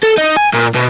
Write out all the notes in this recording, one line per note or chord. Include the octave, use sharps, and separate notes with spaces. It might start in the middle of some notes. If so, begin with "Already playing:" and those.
A4
D#4
G#5
A#2
B2